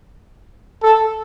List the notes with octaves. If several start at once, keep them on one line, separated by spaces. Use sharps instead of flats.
A4